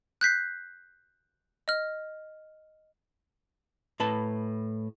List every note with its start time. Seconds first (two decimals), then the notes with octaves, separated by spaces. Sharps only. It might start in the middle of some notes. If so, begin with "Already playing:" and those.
0.21 F#6 G6 B6 C7
1.68 D#5 F6
4.00 A2 B4 A5